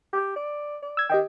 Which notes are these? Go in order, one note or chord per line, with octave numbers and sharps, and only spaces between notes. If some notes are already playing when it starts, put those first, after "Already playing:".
G4
D5
D5
E6 G#6
D#3 G4 D#5 G5